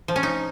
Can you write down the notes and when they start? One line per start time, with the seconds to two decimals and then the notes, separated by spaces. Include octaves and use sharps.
0.08 F3
0.16 C#4
0.23 D#4